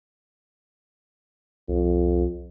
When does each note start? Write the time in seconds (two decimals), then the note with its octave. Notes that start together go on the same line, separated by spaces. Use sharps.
1.69 C2 F2